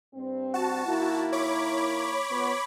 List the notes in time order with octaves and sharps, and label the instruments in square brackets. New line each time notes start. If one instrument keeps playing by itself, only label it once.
[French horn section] G2 C4
[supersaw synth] F#4 A5
[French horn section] D#3 A#3 E4
[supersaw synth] C#5 B5 D6
[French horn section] F3 B3